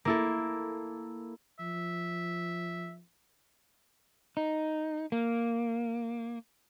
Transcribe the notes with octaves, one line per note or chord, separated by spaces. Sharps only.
A#3 E4 A4
F3 E5
D#4
A#3